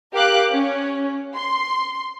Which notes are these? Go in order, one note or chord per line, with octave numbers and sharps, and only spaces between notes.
G4 A#4 F5 D6 F#6
C#4
C6